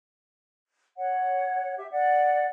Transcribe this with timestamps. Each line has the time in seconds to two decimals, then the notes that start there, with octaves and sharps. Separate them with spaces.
0.97 C#5 F#5
1.78 G4 E5
1.92 D5 F#5